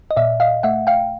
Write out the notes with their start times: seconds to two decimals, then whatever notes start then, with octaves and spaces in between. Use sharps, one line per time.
0.11 D#5
0.16 A#2 D5 E5
0.40 D#5 F5
0.63 A3 E5 F#5
0.87 F5 G5